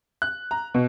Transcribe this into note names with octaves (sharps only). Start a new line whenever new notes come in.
F#6
A#5
B2